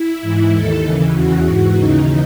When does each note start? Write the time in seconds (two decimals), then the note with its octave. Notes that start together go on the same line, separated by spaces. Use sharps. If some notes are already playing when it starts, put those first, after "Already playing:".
Already playing: E4
0.22 G#2 E3
0.52 D#2 D#3 A4
0.83 D#2 C#3 E3
1.13 E2 C#3 E3 F#4
1.45 G#2 E3
1.75 D#2 C#3 E3 D#4